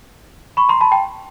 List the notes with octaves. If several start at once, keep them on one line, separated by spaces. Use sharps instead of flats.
B5 C#6
A#5 C6
A5 B5
G5 A5